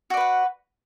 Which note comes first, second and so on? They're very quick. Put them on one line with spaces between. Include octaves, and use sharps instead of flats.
F#4 D5 B4 F#5